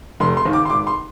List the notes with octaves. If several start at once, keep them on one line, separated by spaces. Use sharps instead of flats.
F1 C6
C6
D#2 D#3
D6
C6
G#1 D6
C6